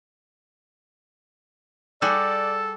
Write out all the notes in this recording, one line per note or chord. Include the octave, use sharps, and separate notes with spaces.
G3 F#4 G#4 A4 D5